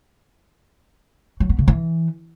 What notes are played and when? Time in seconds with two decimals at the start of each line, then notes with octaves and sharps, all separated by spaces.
1.40 F#3
1.49 B3
1.59 C#3
1.68 E3